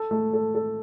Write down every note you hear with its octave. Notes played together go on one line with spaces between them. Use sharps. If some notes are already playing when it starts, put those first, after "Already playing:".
Already playing: A4
A3
A4
A4